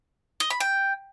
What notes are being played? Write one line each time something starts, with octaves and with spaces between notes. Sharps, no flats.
D#5
B5
G5